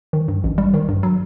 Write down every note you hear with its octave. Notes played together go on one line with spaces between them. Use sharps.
D#3
G2
A1
G3
D#3
G2
F#3